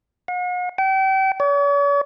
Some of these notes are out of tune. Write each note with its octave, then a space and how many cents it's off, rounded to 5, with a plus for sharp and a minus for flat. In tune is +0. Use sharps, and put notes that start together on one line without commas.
F#5 -45
G5 -35
C#5 +45